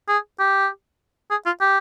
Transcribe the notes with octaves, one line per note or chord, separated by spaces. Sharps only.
G#4
G4
G#4
F4
G4